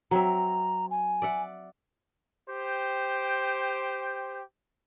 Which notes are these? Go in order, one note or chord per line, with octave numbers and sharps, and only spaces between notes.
F#3 C4 E5 A#5
G#5
D5 E5 F#5
G4 C5 G5